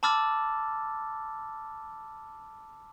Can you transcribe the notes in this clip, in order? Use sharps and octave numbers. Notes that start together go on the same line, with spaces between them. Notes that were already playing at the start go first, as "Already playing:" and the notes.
A5 B5 D6 E6 F6 A6